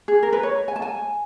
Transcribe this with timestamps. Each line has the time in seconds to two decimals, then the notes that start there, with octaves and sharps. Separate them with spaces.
0.08 G#4
0.23 A#4
0.33 B4
0.43 C#5
0.68 G#5
0.76 A5
0.82 G#5